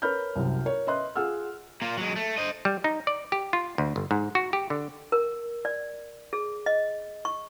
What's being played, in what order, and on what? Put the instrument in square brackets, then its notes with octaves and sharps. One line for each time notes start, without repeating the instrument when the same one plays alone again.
[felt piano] A#4 B4 C#5 B5 F6 G6
C2 F#2 C3
A#4 C#5
B4 D#5 E5 C6 F#6
F4 G#4 F#5 E6 F6
[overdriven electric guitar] A#2 A#3
F#3 G#3
A3
C5 D#5
[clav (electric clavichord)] G3
D#4
D5
G4
F4
D2
G1
G#2
F#4
G4
D3
[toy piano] A#4
D5
G#4
D#5
C#6